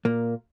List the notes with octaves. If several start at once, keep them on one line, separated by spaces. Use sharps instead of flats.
A#2 A#3